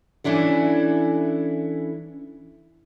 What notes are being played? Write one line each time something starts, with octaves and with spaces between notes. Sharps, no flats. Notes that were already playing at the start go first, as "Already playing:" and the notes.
E3 C#4 D4 E4 A4